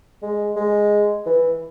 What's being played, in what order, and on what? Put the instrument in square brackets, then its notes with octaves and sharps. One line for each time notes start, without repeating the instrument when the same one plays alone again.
[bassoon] G#3
G#3
E3